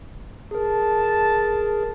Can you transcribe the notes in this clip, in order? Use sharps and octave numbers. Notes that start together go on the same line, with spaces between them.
G#4 A#4 A5